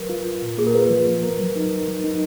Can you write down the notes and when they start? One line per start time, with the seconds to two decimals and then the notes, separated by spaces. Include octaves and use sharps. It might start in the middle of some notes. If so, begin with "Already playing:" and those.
Already playing: F#3 A#4 B4
0.09 F4
0.25 F4
0.42 A#2
0.58 A#3 G#4
0.67 A#4
0.74 F4 B4
0.90 F3
1.07 B3
1.23 A#4
1.40 F#3
1.56 D#4
1.71 A#4
1.88 F#3
2.04 D#4